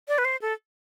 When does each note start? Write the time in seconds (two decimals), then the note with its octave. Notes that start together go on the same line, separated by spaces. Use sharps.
0.08 D5
0.18 B4
0.25 C5
0.42 A4